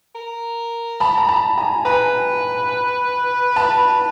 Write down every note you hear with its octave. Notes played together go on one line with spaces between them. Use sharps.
A#4
A5 B5
A#5
A5 B5
G#5 A#5
B4 G#5 A#5
A5 B5